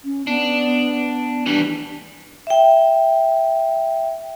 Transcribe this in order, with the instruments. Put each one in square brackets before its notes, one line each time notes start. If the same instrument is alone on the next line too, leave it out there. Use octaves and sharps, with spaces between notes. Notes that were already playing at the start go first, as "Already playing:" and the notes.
[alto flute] C#4
[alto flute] B3 [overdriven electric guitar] D4
[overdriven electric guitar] E3 G3 [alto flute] D4
[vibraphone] E5 G5